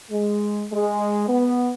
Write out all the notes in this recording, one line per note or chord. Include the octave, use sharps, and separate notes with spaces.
G#3
G#3
B3